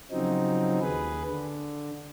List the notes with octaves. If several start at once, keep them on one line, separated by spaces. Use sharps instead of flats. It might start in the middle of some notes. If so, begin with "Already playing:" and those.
C#3 F3 F#3 C4 D#4
D#2 G#4 B4
D3